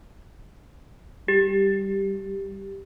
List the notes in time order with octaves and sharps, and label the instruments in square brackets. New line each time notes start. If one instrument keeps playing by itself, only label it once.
[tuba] G3 [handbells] G4